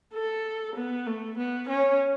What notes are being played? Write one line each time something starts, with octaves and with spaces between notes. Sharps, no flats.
A4
B3
A3
B3
C#4